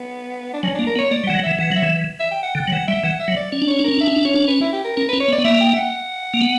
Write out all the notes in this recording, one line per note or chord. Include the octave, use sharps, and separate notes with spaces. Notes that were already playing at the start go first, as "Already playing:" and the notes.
Already playing: B3
D4
F#3 C#4
A#3 D4
A#4
B3
C#5
A#3 D5
G3
E3 F#5
F#3
E3 E5
E3 F#5
F#3 E5
E3
E5
G5
F#5
D3 G5
F#3
E3 F#5
G3 E5
E3 F#5
E5
F#3
D5
C#4 D5
D4
C#4 C#5
D4
C#4 A#4
D4 E5
C#4
D4
C#4 C#5
D4
C#4 B4
E4
G4
A#4
C#4 A#4
C#4 B4
C#5
B3
D5
B3
A#3 E5
G5
E5
F#5
A#3
B3